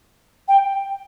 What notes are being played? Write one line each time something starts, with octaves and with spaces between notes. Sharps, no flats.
G5